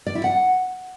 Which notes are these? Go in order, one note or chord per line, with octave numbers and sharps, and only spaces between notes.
D5
E4
F#5